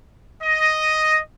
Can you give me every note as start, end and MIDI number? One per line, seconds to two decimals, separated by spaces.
0.42 1.20 75